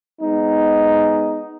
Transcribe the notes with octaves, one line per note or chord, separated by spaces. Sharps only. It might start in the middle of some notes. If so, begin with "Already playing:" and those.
G#3 B3 D#4